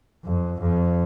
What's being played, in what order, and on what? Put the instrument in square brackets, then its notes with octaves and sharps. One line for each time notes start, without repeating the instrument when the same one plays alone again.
[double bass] F2
F2